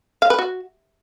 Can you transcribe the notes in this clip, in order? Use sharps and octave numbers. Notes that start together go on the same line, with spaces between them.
F5
B4
F#4